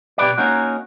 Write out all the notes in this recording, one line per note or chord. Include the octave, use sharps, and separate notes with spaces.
B2 G4 B4 D5
A#3 C#4 D#4 F#4